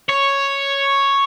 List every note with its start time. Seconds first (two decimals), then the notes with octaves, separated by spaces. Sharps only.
0.09 C#5